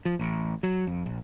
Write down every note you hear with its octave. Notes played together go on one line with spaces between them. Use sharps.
F3
A1
F#3
F2
A#1